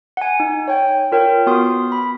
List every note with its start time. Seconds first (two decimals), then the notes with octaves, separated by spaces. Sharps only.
0.17 F#5 G#5
0.40 D#4
0.68 C#5 G5
1.12 F4 A#4 C#5 G5
1.47 B3 F#4 C6 D#6
1.92 B5